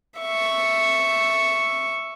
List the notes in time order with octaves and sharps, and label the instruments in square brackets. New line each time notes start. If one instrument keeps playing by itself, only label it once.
[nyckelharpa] E5 C#6